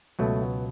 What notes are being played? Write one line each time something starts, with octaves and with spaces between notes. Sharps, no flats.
C#2 B2 F#3 A3
B3